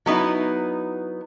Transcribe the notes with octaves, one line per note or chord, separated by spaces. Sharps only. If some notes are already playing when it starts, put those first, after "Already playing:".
F#3 B3 D#4 E4